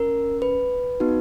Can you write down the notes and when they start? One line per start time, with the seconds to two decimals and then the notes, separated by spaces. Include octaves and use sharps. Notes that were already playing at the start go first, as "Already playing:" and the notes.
Already playing: C#4 A#4
0.42 B4
1.00 B3 D#4 F#4